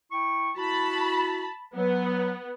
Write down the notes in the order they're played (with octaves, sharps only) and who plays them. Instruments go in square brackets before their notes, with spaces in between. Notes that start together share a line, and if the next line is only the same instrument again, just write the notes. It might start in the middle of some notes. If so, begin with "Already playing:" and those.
[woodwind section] E4 G5 C#6
[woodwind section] E4 F#4 [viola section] A5 B5
[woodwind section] F#3 [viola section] B3